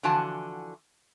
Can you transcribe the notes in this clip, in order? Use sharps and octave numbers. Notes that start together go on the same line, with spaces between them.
D3 E3 F3 F#4 G#5 A5